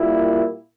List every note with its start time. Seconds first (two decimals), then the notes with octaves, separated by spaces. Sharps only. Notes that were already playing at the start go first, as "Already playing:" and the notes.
Already playing: A#2 G3 A#3 E4